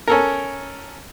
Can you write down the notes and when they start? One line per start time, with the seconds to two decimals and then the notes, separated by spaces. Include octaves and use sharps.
0.08 C#4 A4 A#4